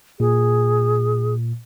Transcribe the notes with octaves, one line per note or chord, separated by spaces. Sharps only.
A#2 G#4